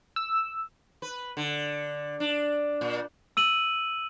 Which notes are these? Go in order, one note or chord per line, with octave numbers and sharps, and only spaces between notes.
E6
B4
D3
D4
A#2
E6 D#7 F#7